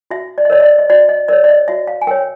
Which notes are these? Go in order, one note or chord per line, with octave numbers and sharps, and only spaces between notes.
F#4 E5
D5
D#5
A#4 C#5 D5
D#5
D5
D#5
F#4 D5
D#5
A#4 C#5 D5
D5
D#5
F#4 E5
F5
G#5
A#4 C#5 G5